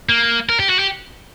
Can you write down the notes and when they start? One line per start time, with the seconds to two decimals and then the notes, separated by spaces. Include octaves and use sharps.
0.09 A#3
0.49 A#4
0.60 G4
0.69 F#4
0.79 G4